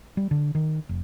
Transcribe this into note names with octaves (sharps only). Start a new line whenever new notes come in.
G3
D3
D#3
F1